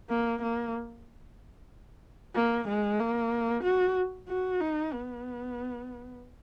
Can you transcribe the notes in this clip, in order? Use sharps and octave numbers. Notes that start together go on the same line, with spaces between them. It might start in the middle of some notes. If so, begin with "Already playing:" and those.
A#3
A#3
A#3
G#3
A#3
F#4
F#4
D#4
B3